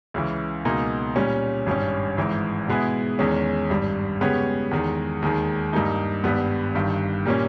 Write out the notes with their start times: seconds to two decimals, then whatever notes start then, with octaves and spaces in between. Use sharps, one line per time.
0.14 C#2 C#3 E3
0.65 C#2 B2 A#3 D#4 G#4
1.16 A#2 G3 C#4
1.66 G#1 G2 G3 C#4
2.17 G#1 G#2 E3
2.68 B2 G#3 B3 E4 G#4
3.19 E2 D#3 G#3 C#4
3.70 G#1 G2 G3
4.21 C#3 G#3 B3 G4 C#5
4.71 E2 D#3 G#3
5.22 D#2 D#3 G#3
5.73 G2 G3 A#3 D#4
6.24 G#1 G2 G3 B3
6.74 G1 G2 D#3
7.26 A#2 G3 A#3 C#4